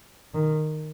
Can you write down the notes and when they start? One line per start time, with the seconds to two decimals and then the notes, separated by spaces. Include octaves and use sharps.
0.34 D#3